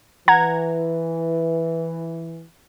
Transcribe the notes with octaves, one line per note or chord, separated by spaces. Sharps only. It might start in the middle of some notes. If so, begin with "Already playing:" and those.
E3 F#5 A#5 G#6